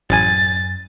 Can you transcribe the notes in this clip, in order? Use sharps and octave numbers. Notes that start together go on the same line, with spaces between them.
A1 F#2 G#5 A6